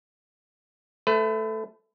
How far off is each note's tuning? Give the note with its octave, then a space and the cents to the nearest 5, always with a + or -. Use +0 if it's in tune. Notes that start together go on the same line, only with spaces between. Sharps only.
A3 +0 B4 +35